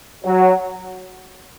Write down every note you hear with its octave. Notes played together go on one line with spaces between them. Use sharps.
F#3